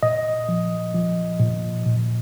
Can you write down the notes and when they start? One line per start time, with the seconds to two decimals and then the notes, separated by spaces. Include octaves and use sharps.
0.03 A#2 D#5
0.49 F3
0.94 F3
1.39 A#2
1.86 A#2